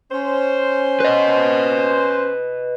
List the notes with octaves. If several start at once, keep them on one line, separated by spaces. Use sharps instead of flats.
C#4 C5
B4 D#5